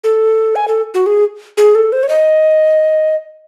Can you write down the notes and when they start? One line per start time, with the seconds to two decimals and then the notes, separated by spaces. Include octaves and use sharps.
0.04 A4
0.56 G#5
0.68 A4
0.94 F#4
1.06 G#4
1.57 G#4
1.75 A4
1.92 C5
2.03 C#5
2.09 D#5